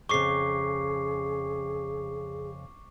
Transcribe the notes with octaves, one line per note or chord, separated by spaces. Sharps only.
F2 C#3 G#4 C#6 D6 C7